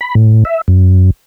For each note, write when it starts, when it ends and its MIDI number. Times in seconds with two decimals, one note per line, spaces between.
0.01 0.15 83
0.15 0.44 45
0.45 0.61 76
0.68 1.10 42